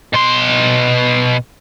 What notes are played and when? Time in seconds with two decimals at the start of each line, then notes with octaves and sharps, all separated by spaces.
0.14 B2 C6